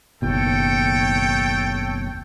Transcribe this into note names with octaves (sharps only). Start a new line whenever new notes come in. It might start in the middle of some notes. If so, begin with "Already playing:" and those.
F#1 D#2 B2 A4 C#5 G5